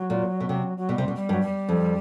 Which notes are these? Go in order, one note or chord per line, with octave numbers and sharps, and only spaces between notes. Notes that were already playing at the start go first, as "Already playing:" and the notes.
Already playing: F#3
A#2
B2
C3
F#3
B2 G3
C3
B2
G3
G2 F#3
G3
F2